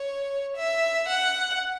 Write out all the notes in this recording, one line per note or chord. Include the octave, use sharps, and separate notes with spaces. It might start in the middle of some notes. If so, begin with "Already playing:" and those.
Already playing: C#5
E5
F#5